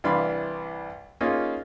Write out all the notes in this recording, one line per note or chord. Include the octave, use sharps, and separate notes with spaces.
C2 E3 D4 F5 B5 C6
A#3 C#4 D#4 F4 G#4